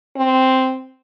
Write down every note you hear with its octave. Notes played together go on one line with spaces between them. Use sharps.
C4